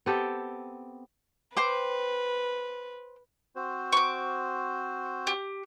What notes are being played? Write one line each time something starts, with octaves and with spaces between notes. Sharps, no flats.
B3 C4 G4 A4
B4 C5 G5 D6
C4 F#4 C5
C#6 D6
G4